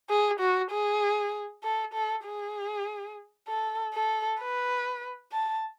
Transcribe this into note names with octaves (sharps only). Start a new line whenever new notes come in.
G#4
F#4
G#4
A4
A4
G#4
A4
A4
B4
A5